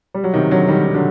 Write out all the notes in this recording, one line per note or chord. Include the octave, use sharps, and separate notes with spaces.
G3
F#3
C3 D#3
D3 F#3
D#3 G3
D#3
D3 F#3